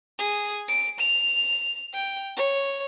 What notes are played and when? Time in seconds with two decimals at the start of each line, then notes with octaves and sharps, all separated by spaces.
0.19 G#4
0.68 D7
0.99 F7
1.94 G5
2.36 C#5